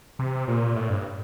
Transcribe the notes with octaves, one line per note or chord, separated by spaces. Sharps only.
C3
A#2
A2
G2